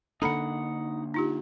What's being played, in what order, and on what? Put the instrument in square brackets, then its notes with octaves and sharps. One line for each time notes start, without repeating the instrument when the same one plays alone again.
[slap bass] D3 A#3 D4 [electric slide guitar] D#4 F#5 [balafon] A4 A#5 B5
[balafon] D#4 F4 G4